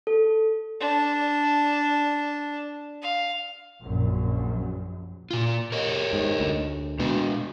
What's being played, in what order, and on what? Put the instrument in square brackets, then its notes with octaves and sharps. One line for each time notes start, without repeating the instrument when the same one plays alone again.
[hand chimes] A4
[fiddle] D4
F5
[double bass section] A#1 F#2 A#2
[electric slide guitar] A#2 F4
A#4 C#5 D#5
[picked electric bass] G#2
D2
[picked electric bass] B2 [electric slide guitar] G#3 D4